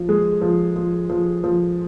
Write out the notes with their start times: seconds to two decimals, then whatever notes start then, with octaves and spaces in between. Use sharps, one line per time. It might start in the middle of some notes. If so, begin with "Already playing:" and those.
Already playing: F3
0.09 G#3
0.42 F3
0.76 F3
1.10 F3
1.44 F3